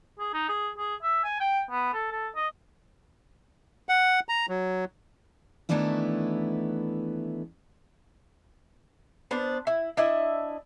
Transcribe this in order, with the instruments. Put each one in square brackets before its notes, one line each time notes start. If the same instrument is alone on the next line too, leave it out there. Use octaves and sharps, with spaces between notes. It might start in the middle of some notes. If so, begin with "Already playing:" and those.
[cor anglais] G#4
D#4
G#4
G#4
E5
G#5
G5
B3
A4
A4
D#5
[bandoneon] F#5
A#5
F#3
[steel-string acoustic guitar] D#3 E3 A3 B3 D4 E4
[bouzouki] B3 D4 C5
E4
D4 E4 D#5 E5